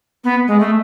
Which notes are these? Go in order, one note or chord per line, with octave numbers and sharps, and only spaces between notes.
B3
G#3
A3